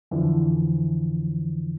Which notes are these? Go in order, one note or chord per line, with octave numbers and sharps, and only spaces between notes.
F2 D3 E3 F3